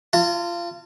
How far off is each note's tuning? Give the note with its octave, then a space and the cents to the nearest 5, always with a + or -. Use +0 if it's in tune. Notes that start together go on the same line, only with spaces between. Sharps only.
F4 -20 A5 +40